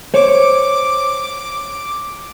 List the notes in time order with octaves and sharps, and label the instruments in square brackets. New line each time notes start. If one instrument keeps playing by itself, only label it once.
[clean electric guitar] C5 C#5 [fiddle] D6